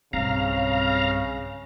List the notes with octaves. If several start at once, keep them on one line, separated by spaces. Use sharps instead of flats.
B1 G2 C#3 C4 F5 A#5